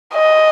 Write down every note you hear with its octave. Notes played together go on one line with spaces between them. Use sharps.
D#5